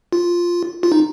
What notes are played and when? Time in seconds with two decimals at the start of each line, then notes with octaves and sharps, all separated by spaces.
0.13 F4
0.83 F4
0.92 D#4